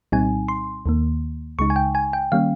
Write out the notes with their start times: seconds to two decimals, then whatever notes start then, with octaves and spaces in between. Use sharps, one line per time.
0.12 C2 A#2 G3 C4 D#4 G#5
0.48 C6
0.86 D#2 D#3 A#3
1.59 C#2 C#3 G#3 D#4 C#6
1.70 G#5
1.76 G5
1.95 G#5
2.13 G5
2.32 D#3 G3 A#3 C#4 F5